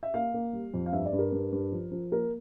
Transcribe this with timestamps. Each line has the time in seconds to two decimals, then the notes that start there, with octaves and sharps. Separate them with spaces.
0.03 E5
0.14 A#3 F5
0.34 A#3
0.53 G3
0.74 F2
0.86 F5
0.92 G2 E5
1.06 D5
1.13 G2
1.19 A#4
1.32 G2
1.52 G2
1.72 F3
1.91 F3
2.11 A#3 A#4